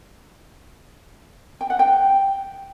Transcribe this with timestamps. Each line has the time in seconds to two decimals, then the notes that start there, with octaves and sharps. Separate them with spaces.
1.61 G5
1.70 F#5
1.79 G5